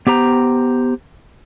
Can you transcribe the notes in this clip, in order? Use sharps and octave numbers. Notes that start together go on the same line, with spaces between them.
B3 G4 C5 A#5